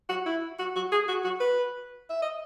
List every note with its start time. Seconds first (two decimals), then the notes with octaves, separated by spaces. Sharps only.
0.09 F#4
0.26 E4
0.59 F#4
0.76 F#4
0.92 G#4
1.08 F#4
1.24 F#4
1.40 B4
2.10 E5
2.22 D#5